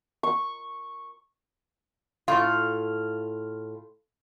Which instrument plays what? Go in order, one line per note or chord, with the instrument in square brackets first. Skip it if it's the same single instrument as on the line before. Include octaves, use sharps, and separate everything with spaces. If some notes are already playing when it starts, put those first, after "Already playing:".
[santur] C#6
[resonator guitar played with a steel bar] A2 F4